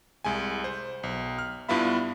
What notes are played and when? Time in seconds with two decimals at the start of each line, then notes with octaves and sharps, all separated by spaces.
0.24 C2 G#3 G#5
0.64 C5
1.03 B1
1.38 F6
1.69 G2 B3 E4 F4 E5 B5